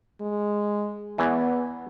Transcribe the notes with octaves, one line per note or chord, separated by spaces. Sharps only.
G#3
E2 E3 B3